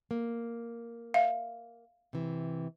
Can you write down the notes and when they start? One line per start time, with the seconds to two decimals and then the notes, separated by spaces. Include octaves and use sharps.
0.11 A#3
1.14 E5 F5
2.13 C3 E3